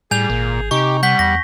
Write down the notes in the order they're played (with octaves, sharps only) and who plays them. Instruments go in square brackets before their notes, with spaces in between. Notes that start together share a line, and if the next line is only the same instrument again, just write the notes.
[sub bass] A2 [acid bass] G3 [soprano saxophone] G#4 [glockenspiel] G#5 G6 F7
[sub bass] G#1 [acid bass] A#2
[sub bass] C3 [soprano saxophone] D#4 [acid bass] G4 [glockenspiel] C#6
[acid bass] G3 [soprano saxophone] F#5 [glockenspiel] G6 B6 G7
[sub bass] E2 [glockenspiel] A#6